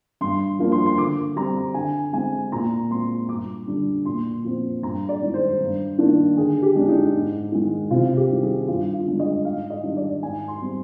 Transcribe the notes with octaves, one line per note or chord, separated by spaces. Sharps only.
G2 C6
F3 A#3 D4
C6
C6
D3 D6
G3 C4 A#5
D3 G#5
G#3 C4 G#5
A#2 A#5
G#3 C4 C6
G2 D6
D3 G3 D4
A#2 C6
F3 C4
G2 A#5
D5
D#3 G#3
C5
G2
D#3 A#3 D4
D3 G#4
G4
G#3 D4
D#4
G#2
D#3 G#3
C3 F4
G4
D#3 G3
G#4
G2 F4
F4
D3 G#3 D4
D#5
G#2 F5
D#5
D#3 G3 D4
D5
G#2 G#5
C6
G3 C4